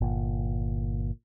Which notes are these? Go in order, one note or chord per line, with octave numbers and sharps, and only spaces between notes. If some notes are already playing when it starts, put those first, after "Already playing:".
G1 A#2